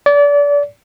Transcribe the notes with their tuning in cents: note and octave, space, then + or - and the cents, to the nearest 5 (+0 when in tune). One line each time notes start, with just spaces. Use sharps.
D5 -30